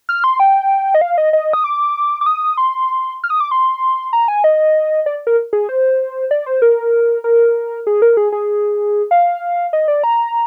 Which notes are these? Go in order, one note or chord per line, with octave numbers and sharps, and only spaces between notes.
F6
C6
G5
D#5
F5
D#5
D#5
D#6
D6
D6
D#6
C6
F6
D#6
D6
C6
A#5
G#5
D#5
D5
A#4
G#4
C5
D5
C5
A#4
A#4
G#4
A#4
G#4
G#4
F5
D#5
D5
A#5